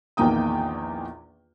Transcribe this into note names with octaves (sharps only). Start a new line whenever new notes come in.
A#1 E2 D#3 A#3 G5 D#6